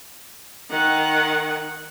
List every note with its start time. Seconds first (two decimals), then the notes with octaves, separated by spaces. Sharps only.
0.70 D#3 F#5